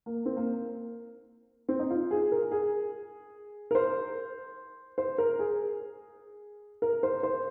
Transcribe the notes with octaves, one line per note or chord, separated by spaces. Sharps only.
A#3
C4
A#3
C4
D#4
F4
G#4
A#4
G#4
A#4
C5
C5
A#4
G#4
A#4
C5
C5